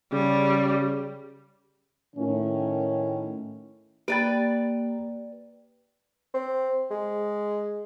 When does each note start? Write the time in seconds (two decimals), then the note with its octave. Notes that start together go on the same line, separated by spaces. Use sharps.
0.12 C#3 G3
2.16 A2 D#3 C#4
4.08 A#3 G4 B4 D5 G5 A6
6.34 C4
6.91 G#3